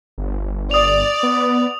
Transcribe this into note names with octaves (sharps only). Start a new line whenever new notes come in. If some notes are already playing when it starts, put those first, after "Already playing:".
G1
D5 D#6 F7
B3